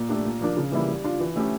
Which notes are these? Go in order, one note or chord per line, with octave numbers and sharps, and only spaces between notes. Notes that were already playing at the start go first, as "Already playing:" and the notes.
Already playing: A#2
A3 D4 G4
A#2
F3 A#3 D4
C#3
E3 G3 A#3 E4
G3
D4 F4
E3
A3 C#4 E4 G4